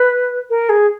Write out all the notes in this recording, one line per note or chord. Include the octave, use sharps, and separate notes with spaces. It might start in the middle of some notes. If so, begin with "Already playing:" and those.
Already playing: B4
A#4
G#4